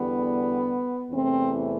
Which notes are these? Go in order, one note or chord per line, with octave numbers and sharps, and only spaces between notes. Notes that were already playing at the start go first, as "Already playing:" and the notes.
Already playing: E2 D3 G3 B3
E2 C3 E3 A3 C4